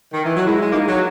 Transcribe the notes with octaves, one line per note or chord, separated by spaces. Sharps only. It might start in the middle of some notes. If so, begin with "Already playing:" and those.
D#3
E3
F#3
G#3 E4
G#3
A#3
G#3 D#4
F#3